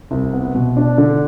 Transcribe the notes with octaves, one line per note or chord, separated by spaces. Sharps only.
C2
B3
B2
D4
D3